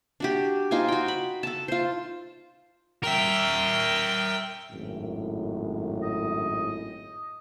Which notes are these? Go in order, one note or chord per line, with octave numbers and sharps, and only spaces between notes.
D4 F#4 G4
D#4 F4 C5 G#5
F#4 G5
B5
A4 A5
F4 C5
A#4 E5 G5
G#1 F#2 A2
D#5